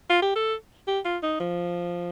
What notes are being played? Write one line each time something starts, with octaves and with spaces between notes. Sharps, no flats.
F4
G4
A4
G4
F4
D#4
F3